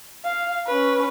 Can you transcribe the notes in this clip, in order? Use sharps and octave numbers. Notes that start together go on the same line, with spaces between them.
F5
C#4 B4